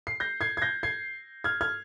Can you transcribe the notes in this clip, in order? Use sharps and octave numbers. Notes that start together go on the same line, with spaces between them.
C7
G6 A#6
G#6 C7
G#6
G6 A#6
G#6 C7
F6 G#6
F6 G#6